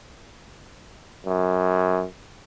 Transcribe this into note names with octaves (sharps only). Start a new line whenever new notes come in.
F#2